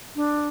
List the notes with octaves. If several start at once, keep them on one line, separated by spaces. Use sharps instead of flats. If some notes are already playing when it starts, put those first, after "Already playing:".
D4